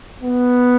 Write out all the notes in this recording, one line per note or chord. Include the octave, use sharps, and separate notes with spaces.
B3